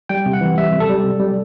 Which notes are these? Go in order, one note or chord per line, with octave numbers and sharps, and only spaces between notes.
G3 G5
C3
F#5
E3
G3 E5
C3
A4
G3
C3
G3